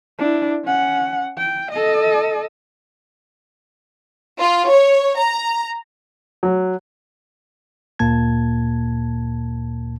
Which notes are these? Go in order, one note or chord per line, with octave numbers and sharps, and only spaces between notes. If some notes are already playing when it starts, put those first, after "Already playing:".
D4 E4
C#4 F#5
G5
A4 D#5
F4
C#5
A#5
F#3
D2 A#2 A#3 A5 G#6